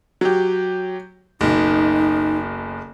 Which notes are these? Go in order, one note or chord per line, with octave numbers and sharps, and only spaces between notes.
F#3 G4
F#1 B1 D#4